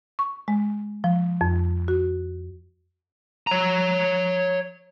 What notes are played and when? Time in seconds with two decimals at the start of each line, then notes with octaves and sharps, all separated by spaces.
0.19 C#6
0.48 G#3
1.04 F3
1.41 F2
1.88 F#4
3.47 C#5 A#5